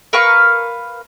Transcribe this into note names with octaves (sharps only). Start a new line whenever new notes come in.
A#4 B4 F5 C#6